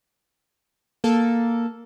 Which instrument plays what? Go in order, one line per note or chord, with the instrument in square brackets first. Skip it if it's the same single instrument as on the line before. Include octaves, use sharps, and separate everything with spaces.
[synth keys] A#3 A4